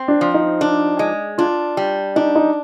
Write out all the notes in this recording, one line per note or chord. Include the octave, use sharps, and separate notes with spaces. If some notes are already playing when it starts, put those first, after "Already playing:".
Already playing: C4
D4
F3
D#4
D4
G#3
D4 F4
G3
D4 D#4
D#4